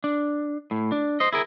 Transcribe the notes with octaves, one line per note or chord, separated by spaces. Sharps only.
D4
A2
D4
C5 D#5
E4 G#4 A#4